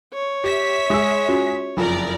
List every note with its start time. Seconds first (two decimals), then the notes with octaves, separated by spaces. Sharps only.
0.13 C#5
0.44 G4 E5 B6
0.90 G#3 G#4 D#6 E6
1.29 C#4 F4 F#4
1.77 F#1 F2 A#4 D5